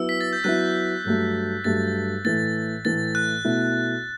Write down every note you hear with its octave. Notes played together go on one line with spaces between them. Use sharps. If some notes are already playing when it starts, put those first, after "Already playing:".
Already playing: F#3 B3 E4 E6
B6
A6
G6
F#3 B3 E4 F#6
G2 F#3 A3
G2 F#3 A3 A6
A2 E3 A3 A6
A2 E3 A3 A6
F#6
B2 A3 E4